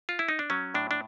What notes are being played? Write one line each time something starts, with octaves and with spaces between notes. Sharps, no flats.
F4
E4
D#4
D4
F#3 C#4
A2 D4
D4